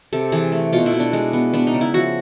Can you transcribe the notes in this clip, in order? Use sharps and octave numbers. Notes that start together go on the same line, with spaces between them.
C3 A4
E3 G#4
A3
B2 F4
E4
B2
D4
G#3
B3
B3 D4
D#4
C#3
E4
F3 F#4